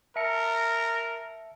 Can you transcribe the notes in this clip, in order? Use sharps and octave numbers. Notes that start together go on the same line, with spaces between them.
A#4 E5 A5 C#7